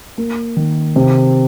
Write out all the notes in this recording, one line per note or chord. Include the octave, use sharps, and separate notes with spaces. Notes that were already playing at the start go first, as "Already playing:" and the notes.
A#3
D#3
C3